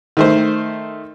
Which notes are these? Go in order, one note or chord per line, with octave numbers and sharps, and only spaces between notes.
D#3 A3 C5